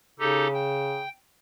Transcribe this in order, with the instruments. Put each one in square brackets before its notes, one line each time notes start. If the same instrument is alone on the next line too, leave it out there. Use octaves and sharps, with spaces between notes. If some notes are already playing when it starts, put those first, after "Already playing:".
[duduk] C#3 [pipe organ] D#4 G4 A4
[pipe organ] G5